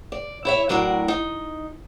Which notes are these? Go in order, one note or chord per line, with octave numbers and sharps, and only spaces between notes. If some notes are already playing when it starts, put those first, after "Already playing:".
D5
E4 C#5 E5
A2 F#3 D4 F#4 A#4
D#4